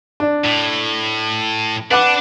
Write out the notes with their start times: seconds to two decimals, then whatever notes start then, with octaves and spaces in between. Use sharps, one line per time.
0.20 D4
0.45 A2
1.91 D4 B4 F#5 D6